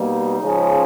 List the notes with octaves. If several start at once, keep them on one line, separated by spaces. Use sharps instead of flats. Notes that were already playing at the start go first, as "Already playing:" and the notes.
Already playing: B2 G3 A#3 D#4
C#3 F3 G#3 C#4